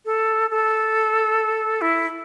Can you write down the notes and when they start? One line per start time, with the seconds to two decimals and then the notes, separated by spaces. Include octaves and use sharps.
0.05 A4
0.50 A4
1.81 E4